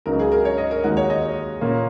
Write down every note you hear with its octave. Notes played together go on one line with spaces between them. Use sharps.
C#2 C#3 F#3 D#4 A#4
G#4
A#4
C#5
D#5
A#4
D#2 D#3 G#3 D#4 F#4
C#5
D#5
A#2 A#3 C#4